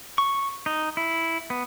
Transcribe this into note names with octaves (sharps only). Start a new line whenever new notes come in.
C#6
D#4
E4
B3